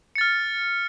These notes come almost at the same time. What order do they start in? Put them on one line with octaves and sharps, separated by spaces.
C#7 A6 F6